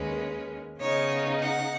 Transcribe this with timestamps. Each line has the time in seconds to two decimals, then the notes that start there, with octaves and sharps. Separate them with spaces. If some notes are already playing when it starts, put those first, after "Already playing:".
Already playing: D#2 D#3 G#3 C#4 B4
0.80 C#3 B3 D#4 C#5
1.42 F#5